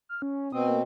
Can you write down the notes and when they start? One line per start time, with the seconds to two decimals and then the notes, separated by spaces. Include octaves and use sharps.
0.09 F6
0.22 C#4
0.53 B2 C4 D#6
0.67 A#3